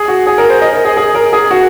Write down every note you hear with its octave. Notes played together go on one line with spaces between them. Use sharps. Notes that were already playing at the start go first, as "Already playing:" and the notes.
Already playing: G#4
F#4
G#4
A#4
C5
D#5
A#4
G#4
G#4
A#4
G#4
F#4